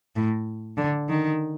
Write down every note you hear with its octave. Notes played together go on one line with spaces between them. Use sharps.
A2
D3
D#3